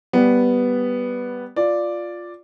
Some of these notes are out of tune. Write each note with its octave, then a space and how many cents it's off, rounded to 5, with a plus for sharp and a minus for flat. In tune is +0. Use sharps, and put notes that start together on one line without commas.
G3 +0 B3 +0
F4 +0 D5 +0